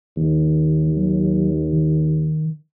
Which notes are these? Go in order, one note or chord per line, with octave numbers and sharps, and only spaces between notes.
D#2 D#3
F#3
D#3